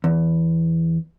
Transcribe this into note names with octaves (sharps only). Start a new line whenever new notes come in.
E2